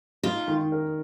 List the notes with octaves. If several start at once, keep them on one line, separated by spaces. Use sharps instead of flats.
D#4 F4
D#3
A#4